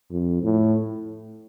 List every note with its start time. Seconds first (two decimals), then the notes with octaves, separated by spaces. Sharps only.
0.11 F2
0.43 A2